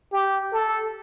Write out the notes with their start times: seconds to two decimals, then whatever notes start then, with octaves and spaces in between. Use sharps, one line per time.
0.12 G4
0.52 A4